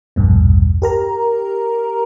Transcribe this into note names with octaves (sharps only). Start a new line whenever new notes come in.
A#1 E2 G2 B2
G4 A#4 A#5